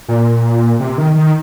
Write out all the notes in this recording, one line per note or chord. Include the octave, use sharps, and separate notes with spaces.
A#2
C3
D#3
D#3